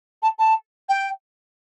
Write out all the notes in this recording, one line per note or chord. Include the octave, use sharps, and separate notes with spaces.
A5
A5
G5